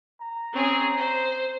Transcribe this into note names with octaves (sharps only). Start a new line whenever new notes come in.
A#5
C4 C#4 G#4
C5